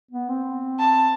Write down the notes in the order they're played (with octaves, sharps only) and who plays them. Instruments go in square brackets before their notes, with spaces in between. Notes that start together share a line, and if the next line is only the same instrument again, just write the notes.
[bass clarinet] B3
C4
[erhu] A5